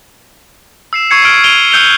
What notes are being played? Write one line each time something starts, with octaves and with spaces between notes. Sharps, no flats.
E6 C7 E7
C#6 E6 G#6 C7 C#7
E6 F6 G#6 C7 D7 F#7
D7 D#7 F7 G7
E6 F#6 G6 C#7 F7 G7